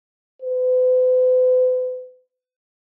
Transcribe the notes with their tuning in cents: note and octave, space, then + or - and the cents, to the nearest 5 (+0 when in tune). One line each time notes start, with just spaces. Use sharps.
B4 +45